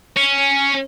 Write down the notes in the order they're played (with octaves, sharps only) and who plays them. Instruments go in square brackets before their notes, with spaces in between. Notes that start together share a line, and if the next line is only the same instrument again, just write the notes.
[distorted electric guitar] C#4